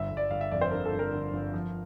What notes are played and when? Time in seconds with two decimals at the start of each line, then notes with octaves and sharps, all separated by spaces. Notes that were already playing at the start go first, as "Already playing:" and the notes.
Already playing: G1 E5
0.10 G1
0.17 D5
0.31 G1 F5
0.41 E5
0.51 F2 D5
0.61 C5
0.71 D3 A#4
0.85 A4
0.92 G1
0.99 A#4
1.13 D3
1.33 G1
1.54 F3